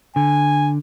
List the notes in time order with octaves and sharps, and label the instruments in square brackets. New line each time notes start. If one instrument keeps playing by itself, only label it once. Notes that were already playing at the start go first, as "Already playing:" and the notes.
[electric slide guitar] D3 [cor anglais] G#5